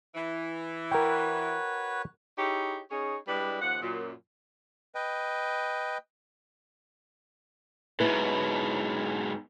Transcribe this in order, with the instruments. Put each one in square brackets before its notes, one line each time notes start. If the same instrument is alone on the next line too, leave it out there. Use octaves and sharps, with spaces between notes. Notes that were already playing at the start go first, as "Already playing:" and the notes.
[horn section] E3
[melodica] F#4 B4 C#5 [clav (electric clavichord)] A#4 G5
[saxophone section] D#4 E4 G4 G#4 C#5
C#4 D#4 G#4 C#5
G3 G#3 D4 E4 B4
D#2 F3 F#5
F#2 A#2
[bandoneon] B4 D#5 G5
[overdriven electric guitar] G#2 B2 [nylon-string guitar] C#4 E4 B4